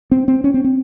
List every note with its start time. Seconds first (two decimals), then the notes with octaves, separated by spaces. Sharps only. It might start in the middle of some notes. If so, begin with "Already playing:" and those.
0.11 C4
0.28 C4
0.44 C#4
0.54 C4
0.64 C4